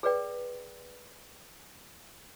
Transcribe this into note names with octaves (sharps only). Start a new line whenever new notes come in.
G#4 B4 D5 G5